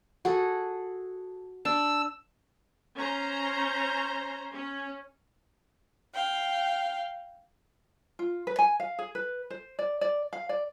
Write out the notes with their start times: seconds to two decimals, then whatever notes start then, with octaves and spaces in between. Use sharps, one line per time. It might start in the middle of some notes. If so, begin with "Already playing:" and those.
0.25 F#4 G#4 A4
1.65 D4 E6
2.97 C#4 C5 A#5
4.53 C#4
6.13 F5 G5
8.19 F4
8.47 B4
8.59 G#5
8.80 F5
8.99 G#4
9.15 B4
9.50 C5
9.79 D5
10.01 D5
10.33 F5
10.49 D5